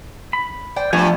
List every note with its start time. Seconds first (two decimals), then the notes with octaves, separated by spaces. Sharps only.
0.33 B5
0.76 C5 D5 G5
0.93 G2 F3 A3 B3 G4 G#5